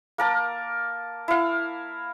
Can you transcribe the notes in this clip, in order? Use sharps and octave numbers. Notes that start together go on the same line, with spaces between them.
A#3 A#4 A5
E4 F5